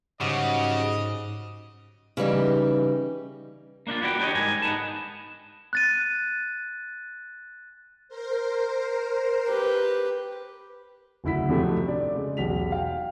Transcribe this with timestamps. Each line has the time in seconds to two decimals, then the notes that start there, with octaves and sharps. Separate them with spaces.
0.20 G#2 C#3 F#3 G3 F#4 D#5
2.17 C#3 E3 G3 D#4
3.87 A#3 D4 D#4 F4
4.02 B3 E4 F#4 D#5 G5
4.19 D4 G4 B4 C#5 D#5
4.35 G#2 G3 A#4 G#5
4.62 B3 D#4 A5
5.73 F#6 A6 D#7
8.08 A#4 C5
9.48 G4 B4
11.24 F#1 D2 E4 B6
11.49 F2 A2 C3 F#3 A3 C4
11.87 D4 D5
12.15 C#3 G#3
12.37 E1 B1 G4 B6 F7
12.72 F5 G5